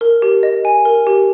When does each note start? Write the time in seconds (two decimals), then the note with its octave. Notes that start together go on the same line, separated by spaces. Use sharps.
0.01 A#4
0.22 G4
0.43 D#5
0.65 G#5
0.85 A#4
1.07 G4